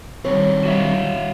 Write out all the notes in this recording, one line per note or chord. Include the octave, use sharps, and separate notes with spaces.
D#3 F#3 G3 C4 C#5
F#4 E5 F5